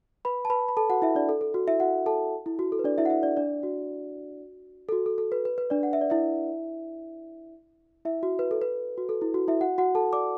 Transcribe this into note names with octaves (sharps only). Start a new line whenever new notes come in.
B4 B5
A5
B4 B5
B5
A4 A5
F#4 F#5
E4 E5
D4 D5
A4
A4
F#4
E4 E5
F#4 F#5
A4 A5
E4
F#4
A4
B4
D4 D5
E4 E5
F#5
E4 E5
D4 D5
D4 D5
F#4
A4
F#4
A4
A4
B4
B4
B4
D4 D5
F#5
E5
D5
E4 E5
E4 E5
F#4
B4
A4
B4
F#4
A4
E4
F#4
E4 E5
F#4 F#5
F#4 F#5
A4 A5
D5 D6